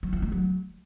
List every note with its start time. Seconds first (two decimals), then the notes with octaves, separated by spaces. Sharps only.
0.03 F#3
0.13 F3
0.22 G#3
0.32 F#3